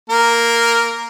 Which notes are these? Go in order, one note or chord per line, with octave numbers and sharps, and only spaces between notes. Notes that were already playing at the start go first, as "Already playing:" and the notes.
A#3 A#4